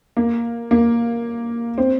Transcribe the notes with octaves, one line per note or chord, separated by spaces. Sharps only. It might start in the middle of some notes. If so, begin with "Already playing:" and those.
A#3
A#3
C4